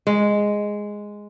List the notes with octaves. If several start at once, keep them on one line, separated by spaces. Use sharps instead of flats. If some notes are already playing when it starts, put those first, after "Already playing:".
G#3